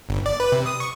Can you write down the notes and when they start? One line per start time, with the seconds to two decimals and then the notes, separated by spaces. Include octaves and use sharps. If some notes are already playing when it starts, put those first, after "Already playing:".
0.09 G1
0.26 D5
0.40 B4
0.52 C3
0.66 D#6
0.80 C#6